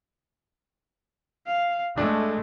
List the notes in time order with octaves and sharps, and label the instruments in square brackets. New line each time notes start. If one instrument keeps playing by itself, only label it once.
[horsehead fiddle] F5
[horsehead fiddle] G#3 [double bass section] A3 [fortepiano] D4